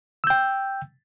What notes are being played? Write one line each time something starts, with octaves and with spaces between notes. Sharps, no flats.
G5 E6 G6